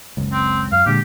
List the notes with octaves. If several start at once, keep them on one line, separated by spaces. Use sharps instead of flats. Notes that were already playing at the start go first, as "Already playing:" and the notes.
F#1 C#2
C4
F#2 F5
A#2 D3 G#3 G4